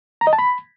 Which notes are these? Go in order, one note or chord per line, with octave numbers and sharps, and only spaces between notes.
A#5
D#5
A5
B5